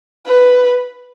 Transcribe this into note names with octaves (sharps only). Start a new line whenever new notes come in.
B4